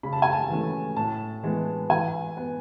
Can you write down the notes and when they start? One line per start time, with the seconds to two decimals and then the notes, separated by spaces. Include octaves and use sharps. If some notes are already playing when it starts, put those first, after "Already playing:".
0.03 C#3 B5
0.13 A5
0.22 G#5
0.32 A5
0.50 E3 A3 C#4
0.97 A2 A5
1.43 E3 G#3 B3
1.90 E3 G#5
2.37 B3